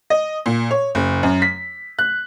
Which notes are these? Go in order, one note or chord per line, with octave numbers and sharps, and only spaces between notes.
D#5
A#2
C#5
F#1
F#2
B6
F#6